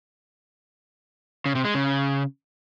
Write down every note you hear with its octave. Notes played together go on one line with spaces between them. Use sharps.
C#3
C3
G#3
C#3